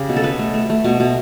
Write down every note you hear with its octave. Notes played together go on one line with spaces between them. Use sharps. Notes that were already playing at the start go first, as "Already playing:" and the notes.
Already playing: C#3 G4
B2
A4
B2 B4
A3
A3
A3
B2
B2